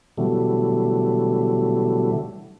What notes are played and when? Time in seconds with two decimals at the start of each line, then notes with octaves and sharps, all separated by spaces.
0.17 B2 D3 E3 F#3 G3 A3